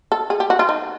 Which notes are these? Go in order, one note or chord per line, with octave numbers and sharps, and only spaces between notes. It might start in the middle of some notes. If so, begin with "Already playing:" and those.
A4
G#4
G4
F#4
F4
D#4